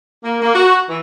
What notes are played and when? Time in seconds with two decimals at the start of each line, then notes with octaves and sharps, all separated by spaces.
0.24 A#3
0.42 A#3
0.55 F#4
0.89 E3